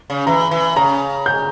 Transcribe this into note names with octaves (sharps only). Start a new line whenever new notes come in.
C#3
E3 A#5
E3
C#3 A#5
G6